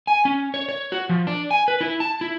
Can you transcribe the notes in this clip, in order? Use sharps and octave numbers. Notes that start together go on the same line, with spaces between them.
G#5
C#4
C#5
C#5
F#4
F3
D4
G#5
B4
E4
A5
E4